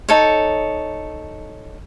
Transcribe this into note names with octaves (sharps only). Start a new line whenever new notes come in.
D#4 A4 C#5